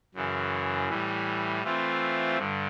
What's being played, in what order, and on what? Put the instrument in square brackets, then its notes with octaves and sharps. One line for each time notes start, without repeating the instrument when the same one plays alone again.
[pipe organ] F#2 C#3 E3
A2 E3 G3
E3 A3 C4 F4
G2 D3